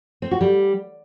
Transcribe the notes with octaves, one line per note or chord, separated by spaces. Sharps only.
C4
F#4
G3